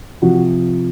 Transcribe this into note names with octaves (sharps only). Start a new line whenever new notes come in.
C3 F3 F#4